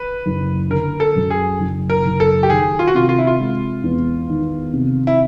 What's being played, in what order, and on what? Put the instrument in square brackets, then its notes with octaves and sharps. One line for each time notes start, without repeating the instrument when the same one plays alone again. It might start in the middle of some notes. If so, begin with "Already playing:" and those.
Already playing: [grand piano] B4
[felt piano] F#1
[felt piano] D3 [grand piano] A#4
[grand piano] A4
[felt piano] F#2
[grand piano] G#4
[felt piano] F#1
[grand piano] A#4
[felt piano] F#1
[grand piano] A4
G4
[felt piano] D#3 [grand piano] G#4
[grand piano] F4
F#4
[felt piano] C3 [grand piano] F4
[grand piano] F4
E4
F4
[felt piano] G#3
E2
D#3
C3
[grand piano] E4